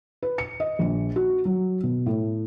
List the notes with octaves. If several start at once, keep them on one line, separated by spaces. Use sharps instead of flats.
B4
C#7
D#5
A#1
F#4
F#3
B2
A2